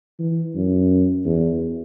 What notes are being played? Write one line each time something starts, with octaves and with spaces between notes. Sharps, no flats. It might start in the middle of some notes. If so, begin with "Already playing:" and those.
E3
F#2
E2